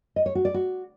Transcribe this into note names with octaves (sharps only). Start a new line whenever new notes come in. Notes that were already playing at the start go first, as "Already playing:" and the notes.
D#5
C#5
F#4
D5
F#4